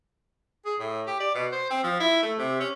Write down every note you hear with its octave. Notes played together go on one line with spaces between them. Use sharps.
G#4
A2
G4
D5
B2
C5
C4
F3
E4
A3
C3
C#4